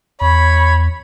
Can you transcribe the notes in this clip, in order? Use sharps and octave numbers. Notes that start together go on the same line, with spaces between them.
E2 C#5 B5